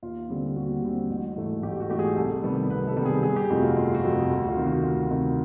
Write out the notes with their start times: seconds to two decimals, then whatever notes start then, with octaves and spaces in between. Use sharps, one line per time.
0.03 D#2 F4
0.29 D3 G3 C4
0.56 D#2 F#4
0.82 D3 G3 C4
1.10 A1
1.36 G#2 E3 A3
1.63 A1 G4
1.80 F#4
1.89 G#2 E3 A3 G4
1.99 G#4
2.16 C2 A4
2.43 C3 D#3 G3 B3
2.70 C2 B4
2.87 A4
2.97 C3 D#3 G3 B3
3.05 G#4
3.23 G1 G#4
3.36 G4
3.50 F2 C3 F3 A3 F#4
3.63 F4
3.76 G1 F4
3.94 F#4
4.04 F2 C3 F3 A3
4.12 G#4
4.30 D2 F#4
4.43 F#4
4.48 F4
4.57 C3 D#3
4.66 F#4
4.83 D2 F4
5.10 C3 D#3